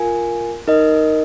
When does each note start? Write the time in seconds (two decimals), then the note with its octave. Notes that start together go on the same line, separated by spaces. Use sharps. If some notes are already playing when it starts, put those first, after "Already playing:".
Already playing: F4 A#4 F5 G#5
0.68 D#4 A#4 D#5